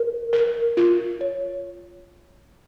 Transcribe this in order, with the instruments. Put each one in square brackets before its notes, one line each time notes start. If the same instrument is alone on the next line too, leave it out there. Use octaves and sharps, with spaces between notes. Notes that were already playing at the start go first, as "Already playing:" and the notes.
Already playing: [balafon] A#4
A#4
F4
C#5